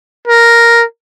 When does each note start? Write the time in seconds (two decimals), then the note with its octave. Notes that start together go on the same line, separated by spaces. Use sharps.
0.28 A#4